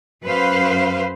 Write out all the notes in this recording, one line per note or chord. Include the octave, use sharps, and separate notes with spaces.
F#2 B4 C5 F5